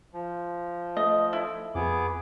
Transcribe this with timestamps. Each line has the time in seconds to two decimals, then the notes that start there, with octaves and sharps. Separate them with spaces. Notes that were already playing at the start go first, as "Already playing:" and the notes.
0.14 F3
0.97 A3 D#5
1.33 E4
1.75 F2 B3 G#4 D6